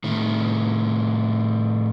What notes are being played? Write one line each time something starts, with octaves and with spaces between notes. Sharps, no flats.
A2 D#3